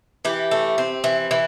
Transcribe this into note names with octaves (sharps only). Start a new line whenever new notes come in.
E3 G4
A3
C4
E3
E3